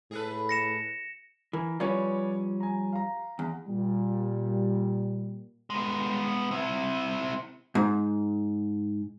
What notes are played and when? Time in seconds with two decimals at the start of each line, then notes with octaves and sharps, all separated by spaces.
0.11 A2 G#4 A4 B4
0.49 A#6 C#7 E7
1.53 E3 A#4 G#5
1.80 F3 G3 C#4 B4 C#5 D5
2.60 G#5 A#5
2.93 F5 A#5
3.39 E2
3.68 A#2 G3
5.70 G#3 B3
6.51 C4 E4
7.75 G#2